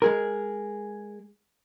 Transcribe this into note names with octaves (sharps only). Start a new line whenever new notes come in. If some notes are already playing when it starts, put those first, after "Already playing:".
G#3 G#4 A#4